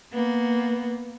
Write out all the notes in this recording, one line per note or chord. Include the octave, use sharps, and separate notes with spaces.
A#3 B3